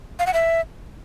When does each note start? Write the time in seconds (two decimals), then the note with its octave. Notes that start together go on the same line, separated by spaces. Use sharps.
0.19 F5
0.27 F#5
0.34 E5